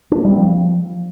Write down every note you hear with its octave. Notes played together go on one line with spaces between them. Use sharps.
D4
A#3
G3
C4
F3